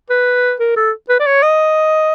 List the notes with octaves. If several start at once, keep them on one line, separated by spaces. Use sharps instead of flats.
B4
A#4
A4
B4
D5
C#5
D#5